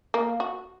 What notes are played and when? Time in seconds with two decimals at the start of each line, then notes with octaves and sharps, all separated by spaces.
0.14 A#3
0.40 F#4